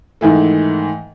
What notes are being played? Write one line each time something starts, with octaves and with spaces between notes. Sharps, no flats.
G#2 D#3 E3 A3